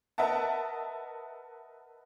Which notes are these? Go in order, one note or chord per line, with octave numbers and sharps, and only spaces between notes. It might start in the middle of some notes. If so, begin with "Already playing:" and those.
A#4 B4 D#5 E5 F#5 A5